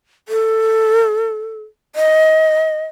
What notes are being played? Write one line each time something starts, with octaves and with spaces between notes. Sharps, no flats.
A4
D#5